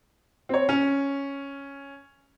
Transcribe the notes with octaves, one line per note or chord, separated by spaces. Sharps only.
C4 C#5
C#4